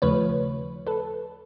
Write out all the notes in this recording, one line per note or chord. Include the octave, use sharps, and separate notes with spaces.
D#2 C#3 F3 A3 B4 C#5
A4 B4